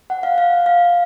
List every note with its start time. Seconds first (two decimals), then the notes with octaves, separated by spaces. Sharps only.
0.10 F#5
0.23 F5
0.38 F5
0.66 F5